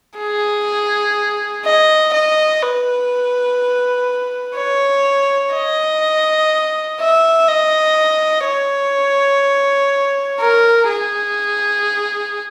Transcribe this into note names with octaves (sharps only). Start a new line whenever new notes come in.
G#4
D#5
D#5
B4
C#5
D#5
E5
D#5
C#5
A#4
G#4